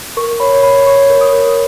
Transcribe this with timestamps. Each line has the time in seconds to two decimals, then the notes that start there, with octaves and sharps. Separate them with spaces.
0.17 A#4 C#6
0.40 C#5 B5
0.63 C#5 B5
0.86 C#5 C#6
1.10 A#4
1.21 D#6
1.33 A#4